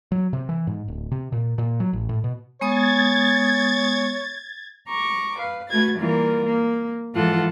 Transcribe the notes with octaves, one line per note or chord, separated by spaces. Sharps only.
F#3
C3
E3
G#2
D1
C3
A#2
A#2
F#3
A1
A2
B2
G#3 B3 C#5 D#6 G#6 A6
A#5 C#6 D6
B4 F5
A3 F#4 B4 G#6 A6
E3 G3 A#3 F4 A#4
A#3
G#2 E3 F3 F4 A4 F#5